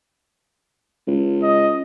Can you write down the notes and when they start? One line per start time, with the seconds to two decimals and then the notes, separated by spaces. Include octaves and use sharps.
1.07 C#2
1.43 D#5